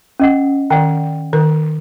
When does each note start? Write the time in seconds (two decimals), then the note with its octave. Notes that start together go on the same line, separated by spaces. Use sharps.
0.19 C#4 D#5 F#5
0.70 D#3 D5 F#5 G5
1.33 D#3 B4